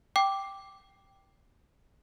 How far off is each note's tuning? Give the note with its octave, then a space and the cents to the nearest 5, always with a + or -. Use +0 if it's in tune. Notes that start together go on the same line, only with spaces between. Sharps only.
G5 +0 D6 +0